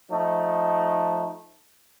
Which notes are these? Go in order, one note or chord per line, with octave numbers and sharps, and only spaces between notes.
F3 A3 D#4